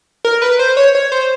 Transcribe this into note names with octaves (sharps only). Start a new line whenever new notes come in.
A#4
B4
C5
C#5
C#5
C5